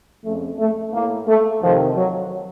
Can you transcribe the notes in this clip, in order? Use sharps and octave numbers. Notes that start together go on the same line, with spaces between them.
F2 C#3 A3
A3
A2 A#3
A3
F2 C3 D#3 F3
F#3